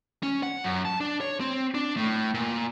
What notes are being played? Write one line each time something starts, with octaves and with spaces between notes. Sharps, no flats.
C#4
F#5
F#2
A5
D4
C#5
C4
D4
A2
A#2